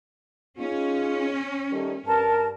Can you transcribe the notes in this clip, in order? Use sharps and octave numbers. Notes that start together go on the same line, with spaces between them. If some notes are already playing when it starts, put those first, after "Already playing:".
C#4 D#4 F4 G#4
D#3 G3 A3
G2 A#4 A5